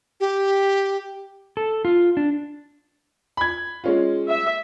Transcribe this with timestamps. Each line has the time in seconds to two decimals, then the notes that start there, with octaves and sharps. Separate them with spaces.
0.20 G4
1.57 A4
1.85 F4
2.17 D4
3.37 B5 G#6
3.84 G#3 C#4 F4
4.28 E5